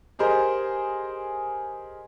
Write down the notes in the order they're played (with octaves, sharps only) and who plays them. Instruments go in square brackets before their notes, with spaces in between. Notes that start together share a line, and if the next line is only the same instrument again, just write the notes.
[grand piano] G4 G#4 A#4 C5 D#5